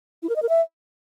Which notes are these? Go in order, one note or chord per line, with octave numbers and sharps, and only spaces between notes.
E4
A#4
D#5
A#4
E5